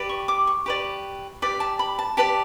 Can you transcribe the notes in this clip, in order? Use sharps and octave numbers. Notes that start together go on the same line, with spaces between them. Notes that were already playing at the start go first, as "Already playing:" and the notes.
Already playing: G4 B4 D5
C#6
D6
C#6
G4 B4 D5
G4 B4 D5
A5
B5
A5
G4 B4 D5 A5